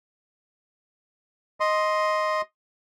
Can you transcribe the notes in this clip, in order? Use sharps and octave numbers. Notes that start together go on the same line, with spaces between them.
D#5 C6